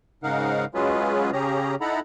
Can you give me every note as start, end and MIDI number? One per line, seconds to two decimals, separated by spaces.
0.23 0.65 44
0.23 0.65 49
0.23 0.65 63
0.23 0.65 70
0.23 0.65 77
0.23 0.65 78
0.74 1.31 54
0.74 1.31 56
0.74 1.31 61
0.74 1.31 65
0.74 1.31 68
0.74 1.31 71
1.33 1.75 49
1.33 1.75 61
1.33 1.75 67
1.33 1.75 68
1.33 1.75 82
1.81 2.00 63
1.81 2.00 64
1.81 2.00 69
1.81 2.00 78
1.81 2.00 82
1.81 2.00 83